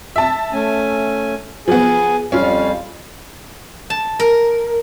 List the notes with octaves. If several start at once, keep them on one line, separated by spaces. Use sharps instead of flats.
E5 A5
A3 C#4 G#5
F3 B3 G#4 G#5
F2 G3 C#4 F4 F5
A5
A#4